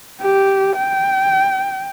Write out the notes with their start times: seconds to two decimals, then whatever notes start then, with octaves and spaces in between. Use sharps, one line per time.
0.21 G4
0.76 G5